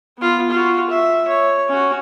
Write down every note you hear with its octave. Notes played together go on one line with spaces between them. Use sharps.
B3 F4
F4 F#4
E5
C#5
C#4 F#4